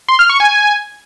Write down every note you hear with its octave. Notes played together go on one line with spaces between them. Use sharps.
C6
F6
C#6
G#5